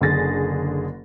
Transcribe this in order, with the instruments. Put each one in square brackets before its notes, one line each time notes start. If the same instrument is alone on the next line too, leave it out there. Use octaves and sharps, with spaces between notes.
[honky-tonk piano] F#1 D3 G#4 A6 A#6